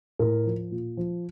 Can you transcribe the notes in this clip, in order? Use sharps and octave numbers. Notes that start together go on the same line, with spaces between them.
A2 A#4
F3
A#2
F3